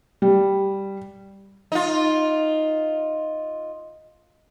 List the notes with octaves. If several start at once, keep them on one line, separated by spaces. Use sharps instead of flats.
G3
D#4 F4